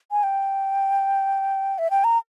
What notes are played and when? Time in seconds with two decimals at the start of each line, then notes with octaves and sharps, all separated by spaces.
0.12 G#5
0.23 G5
1.78 E5
1.91 G5
2.04 A#5